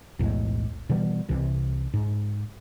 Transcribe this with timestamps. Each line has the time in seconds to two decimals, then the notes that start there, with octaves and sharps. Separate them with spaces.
0.19 B1 E2 A2 G#3
0.89 B2 E3 G3 B3
1.29 C2 C3 E3
1.94 G#2